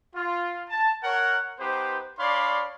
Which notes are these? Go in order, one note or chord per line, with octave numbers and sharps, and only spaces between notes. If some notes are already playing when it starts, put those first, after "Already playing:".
F4
A5
A#4 C#5 F#5
B3 D#4 G4 B4 C5
D4 C#5 D5 F5 B5 C6